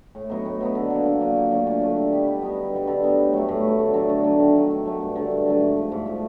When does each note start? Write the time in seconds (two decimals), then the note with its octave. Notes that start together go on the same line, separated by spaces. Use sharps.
0.15 A2
0.30 F#3 B3 D#4
0.45 A2
0.61 F#3 B3 D#4
0.75 D3
0.90 F#3 A#3
1.06 D3
1.21 F#3 A#3
1.36 A#2
1.51 F#3 A3 D4
1.67 A#2
1.81 F#3 A3 D4
1.96 G3
2.12 B3 D#4 G4
2.28 G3
2.42 B3 D#4 G4
2.57 D3
2.73 G3 B3 D#4
2.87 D3
3.04 G3 B3 D#4
3.18 A2
3.33 F#3 A3
3.48 A2
3.64 F#3 A3
3.79 D3
3.94 F#3 A3 D4
4.09 D3
4.24 F#3 A3 D4
4.40 D#3
4.55 F#3 A3
4.70 D#3
4.86 F#3 A3
5.01 G2
5.16 D3 F#3 A3
5.31 G2
5.46 D3 F#3 A3
5.60 G#2
5.76 F3 A3
5.92 G#2
6.06 F3 A3